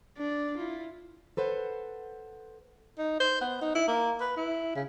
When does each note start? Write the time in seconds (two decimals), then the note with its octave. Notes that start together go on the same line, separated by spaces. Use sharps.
0.17 D4 D5
0.57 E4 F4
1.37 A4 B4 C5 F#5
2.98 D#4
3.20 C5
3.41 B3
3.62 D#4
3.75 E4
3.88 A#3
4.21 B4
4.37 E4
4.75 C#3